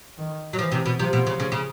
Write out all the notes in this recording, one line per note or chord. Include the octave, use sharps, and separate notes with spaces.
D#3
F#3
E3 F3
C3
B2
C3 F3
B2
C#3
C#3
C#3